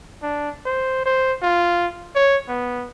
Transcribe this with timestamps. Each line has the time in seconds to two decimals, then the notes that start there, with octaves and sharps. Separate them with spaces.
0.23 D4
0.65 C5
1.06 C5
1.42 F4
2.15 C#5
2.48 B3